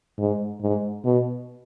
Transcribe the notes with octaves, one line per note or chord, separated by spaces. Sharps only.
G#2
G#2
B2